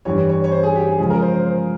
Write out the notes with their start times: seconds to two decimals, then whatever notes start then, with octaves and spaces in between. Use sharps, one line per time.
0.05 G2 E3 G3 C#5
0.29 C#5
0.44 C#5
0.52 C5
0.63 G#4
0.76 G4
0.88 G#4
0.99 C#3 F3 G#3 G#4
1.10 A#4
1.22 C5
1.34 C5
1.46 C5